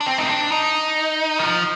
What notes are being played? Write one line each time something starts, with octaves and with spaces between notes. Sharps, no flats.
D4
C4
D#4
D4
D#4
D#3
F3